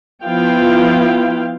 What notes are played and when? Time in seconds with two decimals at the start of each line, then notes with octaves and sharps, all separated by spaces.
0.23 F3 B3 E4 F4 F5 G5